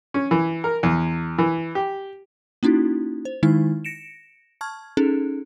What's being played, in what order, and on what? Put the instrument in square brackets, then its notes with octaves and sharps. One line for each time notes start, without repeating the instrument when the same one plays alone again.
[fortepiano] C#4
E3
A#4
E2
E3
G4
[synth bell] A#3 C#4 D#4 E4 F#4
C5
D#3 G#3 D#4 E4 F6
A#6 C#7 D7 E7
A5 C#6 F6 G#6
C#4 D#4 G#4 A4